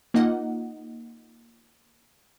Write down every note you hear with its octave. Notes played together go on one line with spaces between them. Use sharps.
A#3 D#4 F4 D#5 F#5